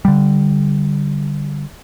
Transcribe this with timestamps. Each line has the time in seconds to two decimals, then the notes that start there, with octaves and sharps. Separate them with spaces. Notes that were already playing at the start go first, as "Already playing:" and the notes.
0.05 D3 G3